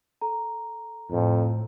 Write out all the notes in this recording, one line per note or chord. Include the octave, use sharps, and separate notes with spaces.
A4 A#5
F2 A2